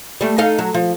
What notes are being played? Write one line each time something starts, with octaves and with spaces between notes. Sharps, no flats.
G3 A3
D#4 A4 F5
F#3
F3